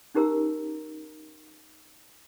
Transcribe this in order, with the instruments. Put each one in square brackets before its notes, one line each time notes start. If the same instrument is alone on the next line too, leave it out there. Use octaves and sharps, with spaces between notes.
[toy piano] C#4 D#4 G4 A#4 A#5 E6